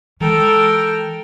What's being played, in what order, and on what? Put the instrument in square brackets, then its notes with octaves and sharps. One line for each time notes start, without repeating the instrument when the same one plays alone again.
[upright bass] E3 G#3 [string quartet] A4 A#4 G5